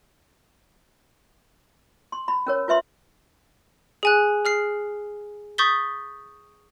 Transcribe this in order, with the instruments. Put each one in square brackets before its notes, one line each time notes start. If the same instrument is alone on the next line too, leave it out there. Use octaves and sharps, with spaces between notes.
[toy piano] C6
B5
C#4 A#4 C#5
F4 B4 E5 C6
[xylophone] G#4 G#5 F#6
G#4 F6 C7
C#6 D#6 G6 A6 B6 G7